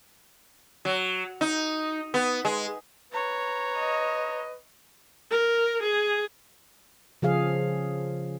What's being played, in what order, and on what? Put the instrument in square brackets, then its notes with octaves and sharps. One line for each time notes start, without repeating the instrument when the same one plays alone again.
[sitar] F#3
D#4
B3
G#3
[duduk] B4 [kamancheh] C#5 A#5
[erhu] D#5
[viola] A#4
G#4
[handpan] C#3 F3 G#4 F5